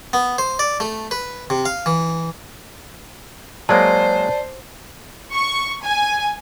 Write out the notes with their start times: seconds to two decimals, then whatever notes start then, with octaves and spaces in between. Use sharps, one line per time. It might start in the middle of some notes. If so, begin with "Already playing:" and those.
0.13 B3
0.38 C5
0.59 D5
0.80 A3
1.11 B4
1.50 C3
1.65 F5
1.86 E3
3.69 F#3 G#3 A#3 C5 D5 A5
5.33 C#6
5.82 G#5